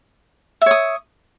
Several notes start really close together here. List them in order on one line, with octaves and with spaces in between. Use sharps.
E5 C#5 D#6